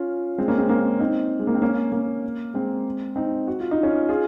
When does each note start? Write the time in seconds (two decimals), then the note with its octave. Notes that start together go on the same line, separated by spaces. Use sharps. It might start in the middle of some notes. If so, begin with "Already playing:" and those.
Already playing: C#4 F4
0.38 G#3 C4
0.48 A#3 C#4
0.58 G#3 C4
0.69 A#3
1.00 C4 D#4
1.39 G#3
1.47 A#3
1.55 C4
1.62 A#3 C#4
1.92 A#3
2.54 G#3 C4
3.16 C4 D#4
3.47 F#4
3.60 F4
3.71 D#4
3.83 C#4 F4
4.09 F4 G#4